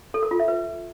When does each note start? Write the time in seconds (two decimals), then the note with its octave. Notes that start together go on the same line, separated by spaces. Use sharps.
0.14 A4
0.23 A#4
0.31 F4
0.40 E5
0.48 B4